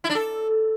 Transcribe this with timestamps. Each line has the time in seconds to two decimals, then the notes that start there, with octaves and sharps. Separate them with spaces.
0.04 E4
0.10 D4
0.15 A4